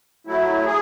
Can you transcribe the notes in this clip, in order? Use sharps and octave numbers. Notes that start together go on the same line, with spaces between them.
F#3 A3 E4
G#4